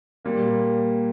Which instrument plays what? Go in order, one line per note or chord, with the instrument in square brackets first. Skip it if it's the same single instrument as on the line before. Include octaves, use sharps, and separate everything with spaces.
[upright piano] A#2 G3 A#3